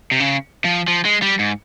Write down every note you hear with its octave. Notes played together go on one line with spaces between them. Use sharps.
C3
C#3
F3
F3
G#3
G3
G#2